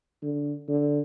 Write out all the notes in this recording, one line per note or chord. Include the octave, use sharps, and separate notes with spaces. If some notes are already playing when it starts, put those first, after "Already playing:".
D3
D3